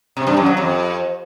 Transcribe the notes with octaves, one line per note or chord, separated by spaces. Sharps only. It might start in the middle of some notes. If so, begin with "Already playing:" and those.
C3
G2
F#2
F#3
F2